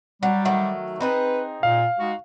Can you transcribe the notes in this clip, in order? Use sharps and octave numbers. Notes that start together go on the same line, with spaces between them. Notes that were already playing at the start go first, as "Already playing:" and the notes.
F#3 G3
D#3 F#3 A3
C4 D#4 G#4 B4
A#2 F5
G#3 D#4 F#4